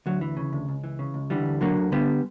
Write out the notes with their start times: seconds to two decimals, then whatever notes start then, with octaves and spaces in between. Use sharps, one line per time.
0.06 D2 F#3
0.21 E3
0.37 C#3
0.53 D2
0.69 C#2
0.84 E3
0.99 C#3
1.14 C#2
1.30 D3 E3 G3
1.46 D2
1.61 D3 F#3 A#3
1.77 D2
1.92 D3 G3 B3